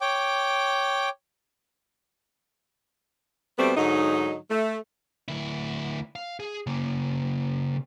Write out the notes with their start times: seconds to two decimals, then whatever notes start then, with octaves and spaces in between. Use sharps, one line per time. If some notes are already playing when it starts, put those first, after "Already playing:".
0.01 C#5 G5 D6
3.58 B2 G3 A3 B3 C4
3.76 G#2 D3 F#3 D#4
4.50 A3
5.28 D2 E4
6.16 F5
6.40 G#4
6.67 C#3 A#3